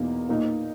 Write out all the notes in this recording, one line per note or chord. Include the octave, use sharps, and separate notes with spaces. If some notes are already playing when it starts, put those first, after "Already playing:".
Already playing: E2 B2 A#3 D#4
A#2 A#3 D#4